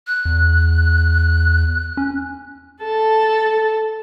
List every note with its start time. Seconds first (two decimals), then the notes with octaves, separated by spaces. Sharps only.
0.07 F#6
0.25 E2
1.97 C#4
2.83 A4 A5